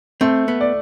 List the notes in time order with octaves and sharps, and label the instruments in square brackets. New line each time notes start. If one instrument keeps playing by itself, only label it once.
[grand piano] A3 [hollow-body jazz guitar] C4
[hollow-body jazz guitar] B3
[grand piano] D5